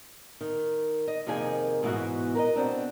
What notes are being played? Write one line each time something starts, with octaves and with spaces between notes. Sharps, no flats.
D#3
D#5
F2 C3 D#3 A#3 G#4 G#5
G#2 B2 E3 B3 C#4 F#4
A#4 B4 D#5
B2 B3 C4 D4